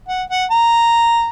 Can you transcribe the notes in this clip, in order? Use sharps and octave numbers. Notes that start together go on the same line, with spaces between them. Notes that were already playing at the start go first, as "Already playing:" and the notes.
F#5
F#5
A#5